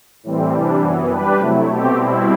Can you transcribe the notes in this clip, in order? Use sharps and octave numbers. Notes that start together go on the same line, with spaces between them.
A2 E3 G3 C4
C3 E3 G3 D4
F#2 E3 B3
G3 D4 G4 B4
C3 F#3 A3 E4
B2 A3 C4 G4
B2 G3 C4 E4